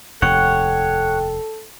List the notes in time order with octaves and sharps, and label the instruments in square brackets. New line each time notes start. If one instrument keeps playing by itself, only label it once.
[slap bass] F1 D#2 [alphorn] A4 [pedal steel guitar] C#5 F#5 [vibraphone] G5